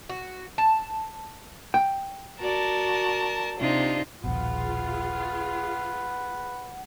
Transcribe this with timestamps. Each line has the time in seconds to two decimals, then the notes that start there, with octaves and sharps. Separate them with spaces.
0.09 F#4
0.58 A5
1.74 G5
2.40 F#4 A#4 D5 A5
3.59 C3 D4 D#4 F4
4.24 D#1 A#1 B2 F4 G#4 B4 F#5